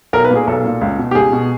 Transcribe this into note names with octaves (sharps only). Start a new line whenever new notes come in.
B1 A#4
B4
A#2
G#4
B1 A4
A#2
C#2
B2
G4
C#2 G#4
B2